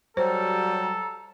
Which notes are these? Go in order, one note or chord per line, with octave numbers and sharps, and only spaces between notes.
F#3 G3 A4 C5 A#5